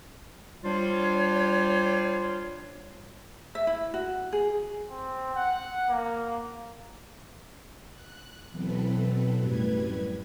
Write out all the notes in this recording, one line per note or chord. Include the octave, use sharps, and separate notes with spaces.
G3 D4 F4 C5 C#5
E5
E4
F#4
G#4
C4
F#5
A#3
F#6
B2 E3 F#3 C4 A4 B4
F#2 A2 G3 B4 G#6